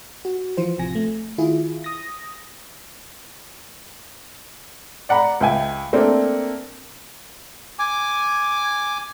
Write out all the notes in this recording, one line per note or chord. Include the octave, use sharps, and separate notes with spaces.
F#4
E3 F3 F4 C5
A1 C3 F3 G#5 A#6
A3
D#3 E4 F4 G#4
D#6 A#6
D5 F#5 A#5 B5
C#2 E5 G5 G#5
A3 A#3 C4 D4
G#5 D6